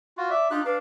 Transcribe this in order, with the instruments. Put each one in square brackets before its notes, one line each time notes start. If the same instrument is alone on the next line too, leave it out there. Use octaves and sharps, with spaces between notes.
[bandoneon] F4 F#4
[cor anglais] D5 [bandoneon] E5
[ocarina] D4 [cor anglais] D#4 [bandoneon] F4 G4 F#6
[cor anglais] D4 [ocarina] B4 [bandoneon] F5